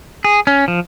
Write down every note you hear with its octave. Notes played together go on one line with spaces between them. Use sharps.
G#4
C#4
F3